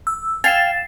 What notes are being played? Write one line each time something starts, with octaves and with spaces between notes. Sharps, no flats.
E6
F5 G5 G#5 A6 C7 E7